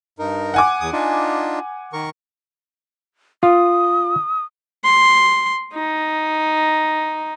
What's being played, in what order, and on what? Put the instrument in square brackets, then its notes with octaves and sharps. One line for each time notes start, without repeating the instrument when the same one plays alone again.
[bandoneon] G2 D#4 A#4
[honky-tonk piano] F#5 G#5 D6
[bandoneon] E2 D#6
D4 D#4 F4
D#3 A#4 C#6
[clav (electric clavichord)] F4 [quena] D#6
[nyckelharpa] C6
D#4